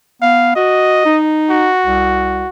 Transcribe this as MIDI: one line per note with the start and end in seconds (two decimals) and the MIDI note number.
0.22 0.55 59
0.22 0.53 77
0.56 1.01 66
0.56 1.21 75
1.05 1.71 63
1.50 2.49 66
1.84 2.43 36